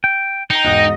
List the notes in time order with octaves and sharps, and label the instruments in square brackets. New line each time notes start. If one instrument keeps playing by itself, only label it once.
[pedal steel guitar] G5
[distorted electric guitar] D#4 [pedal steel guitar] G5 [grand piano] A#5 C7 C#7
[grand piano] E1 G#2 F#6 [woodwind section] D#5